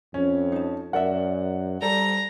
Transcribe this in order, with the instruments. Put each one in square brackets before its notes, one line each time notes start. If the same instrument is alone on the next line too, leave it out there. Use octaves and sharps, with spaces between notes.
[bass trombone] F2 [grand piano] C#4
[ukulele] D#4 A5
[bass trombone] F#2 [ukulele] A#4 D5 E5 [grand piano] F#5
[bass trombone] G3 [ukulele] A4 C5 D5 [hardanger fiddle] A#5